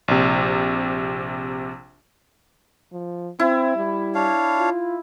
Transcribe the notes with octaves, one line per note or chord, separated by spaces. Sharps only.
A#1 C3
F3
C4 E4
G3
D4 C#5 F5
F4